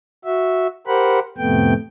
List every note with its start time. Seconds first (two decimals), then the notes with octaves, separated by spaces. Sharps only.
0.25 F#4 E5
0.87 G4 A#4 C5 F#5 B5
1.38 F2 A2 C3 A3 B3 G5